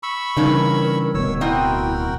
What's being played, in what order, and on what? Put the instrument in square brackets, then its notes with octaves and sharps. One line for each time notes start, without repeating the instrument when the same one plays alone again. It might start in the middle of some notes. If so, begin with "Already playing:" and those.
[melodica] B5 C#6 E6
[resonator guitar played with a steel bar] G2 C#4 D#4 [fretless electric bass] C#3 E3 [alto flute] A#4
[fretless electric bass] D1 D2 B2 [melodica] C#5 E6
[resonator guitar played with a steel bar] C4 D#5 [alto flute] E4 [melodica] F#4 A#4 G5